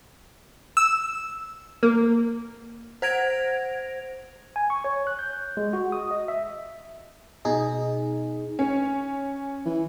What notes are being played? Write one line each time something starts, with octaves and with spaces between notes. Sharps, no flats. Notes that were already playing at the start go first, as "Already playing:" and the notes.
E6
A#3
C5 F#5 G#6 A#6 D7 F7
G#5
C#6
C#5
F#6
G6
G#3
F#4
D#6
D#5
E5
B2 D#4 G#4
C#4
E3